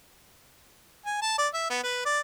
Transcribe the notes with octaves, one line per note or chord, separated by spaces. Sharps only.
G#5
A5
D5
E5
B3
B4
D5